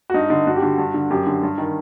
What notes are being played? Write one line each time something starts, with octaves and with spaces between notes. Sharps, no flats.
F#4
G2 D#4
D3 D#4
G2 F#4
G4
D3 F#4
G2
D3
F#2 G4
D3
G2
D#3